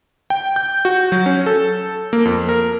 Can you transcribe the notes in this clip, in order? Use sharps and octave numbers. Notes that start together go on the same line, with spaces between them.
G5
G6
F#4
F#3
C#4
A4
A#3
F2
A#4